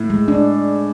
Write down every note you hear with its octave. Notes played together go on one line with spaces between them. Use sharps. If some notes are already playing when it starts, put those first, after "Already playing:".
Already playing: A2
G#3
D4